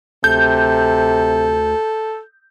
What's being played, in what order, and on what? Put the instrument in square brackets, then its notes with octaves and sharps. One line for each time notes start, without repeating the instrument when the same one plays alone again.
[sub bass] D2 [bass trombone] C3 [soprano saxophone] A4 [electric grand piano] G6